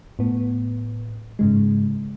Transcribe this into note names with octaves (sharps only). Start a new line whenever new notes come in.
A2 B3
G#2 C#3 G#3